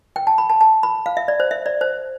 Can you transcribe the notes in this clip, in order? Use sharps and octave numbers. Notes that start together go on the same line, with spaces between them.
G5
A5
B5
A5
A5
B5
F5
E5
D5
C5
E5
D5
C5